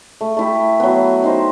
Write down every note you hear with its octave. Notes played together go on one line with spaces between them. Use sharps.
A3
A3 E4 G4
F#3 B3
D#4 G4 C5